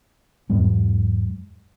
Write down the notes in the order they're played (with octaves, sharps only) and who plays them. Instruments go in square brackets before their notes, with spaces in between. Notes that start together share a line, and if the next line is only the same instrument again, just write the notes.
[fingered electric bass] E2 G#2 F#3 G#3